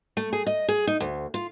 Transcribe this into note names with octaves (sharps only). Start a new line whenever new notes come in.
A3
G#4
D#5
G#4
D#4
D2
F4